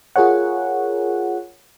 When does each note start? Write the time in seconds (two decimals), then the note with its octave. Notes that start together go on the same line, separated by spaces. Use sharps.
0.16 F4 G#4 A#4 C#5 F#5